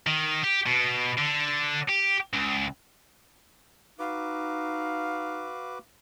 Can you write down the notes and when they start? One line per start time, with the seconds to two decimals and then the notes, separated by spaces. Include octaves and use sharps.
0.07 D#3
0.44 G4
0.66 B2
1.17 D3
1.89 G4
2.33 C#2
3.99 D#4 F#4 B4 F5 D6